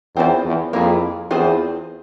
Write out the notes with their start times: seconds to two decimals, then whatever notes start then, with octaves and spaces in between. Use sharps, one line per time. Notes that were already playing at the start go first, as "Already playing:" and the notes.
0.16 E2 C4 F4 C5
0.45 E2
0.73 F2 A#3 E4 G#4
1.30 E2 C4 F4 G#4 C5